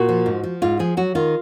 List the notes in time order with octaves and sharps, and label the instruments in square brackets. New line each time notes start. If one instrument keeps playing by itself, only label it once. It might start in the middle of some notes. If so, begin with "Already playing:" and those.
Already playing: [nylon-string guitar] A#2 F#4
F3
G#2
F3
G#2 F4
F3 G#4
F#3 F#4
D#3 F4